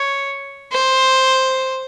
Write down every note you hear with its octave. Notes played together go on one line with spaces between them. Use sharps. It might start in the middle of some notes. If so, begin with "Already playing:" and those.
Already playing: C#5
C5